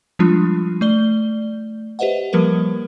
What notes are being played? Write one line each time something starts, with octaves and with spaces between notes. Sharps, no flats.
F3 G3 G#3 D4 F4
A3 D5 G7
G4 B4 C5 D#5 E5 F#5
F3 G3 A#3 A#4 B4